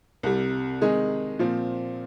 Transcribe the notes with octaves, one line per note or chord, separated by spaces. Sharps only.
C2 C3 G3
C3 D#3 G#3 D#4 G#4
A#2 F3 C4